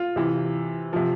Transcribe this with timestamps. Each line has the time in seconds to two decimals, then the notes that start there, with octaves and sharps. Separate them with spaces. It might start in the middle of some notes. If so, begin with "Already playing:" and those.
Already playing: F4
0.16 C3 E3
0.93 C3 F3